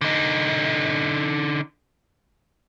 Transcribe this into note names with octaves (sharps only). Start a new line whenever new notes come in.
D3 D#4